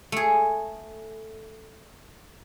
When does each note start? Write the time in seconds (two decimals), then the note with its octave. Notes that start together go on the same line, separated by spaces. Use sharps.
0.12 A3 G#4